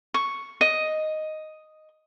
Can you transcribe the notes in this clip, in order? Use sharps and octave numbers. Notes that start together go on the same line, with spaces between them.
C#6
D#5